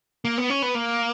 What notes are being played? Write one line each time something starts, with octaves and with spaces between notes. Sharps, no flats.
A#3
B3
C#4
B3
A#3